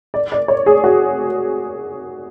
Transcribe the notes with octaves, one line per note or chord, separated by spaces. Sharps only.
D5
D5
C#5
G#4
F#4